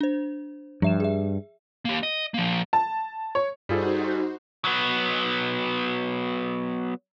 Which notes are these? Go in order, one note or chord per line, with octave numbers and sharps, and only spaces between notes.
D4 C5
G2 F3 E5 E7
G#4 E5
A#3 G4
D#5
F3 A#3
A5
C#5
G2 G3 D#4 F4 F#4 G#4 A4 C5
F#3 B3